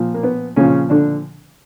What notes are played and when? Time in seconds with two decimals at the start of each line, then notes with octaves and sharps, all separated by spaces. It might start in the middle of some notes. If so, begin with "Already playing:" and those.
Already playing: A#2 F3
0.14 A#3
0.23 B3
0.56 A#2 C#3 F3 C#4
0.90 D3 D4